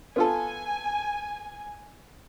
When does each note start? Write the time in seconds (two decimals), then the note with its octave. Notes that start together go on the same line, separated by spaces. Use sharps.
0.16 B3 F4 A4 G#5